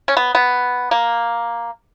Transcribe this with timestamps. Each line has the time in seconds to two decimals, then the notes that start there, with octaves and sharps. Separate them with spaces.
0.08 C#4
0.17 B3
0.35 B3
0.91 A#3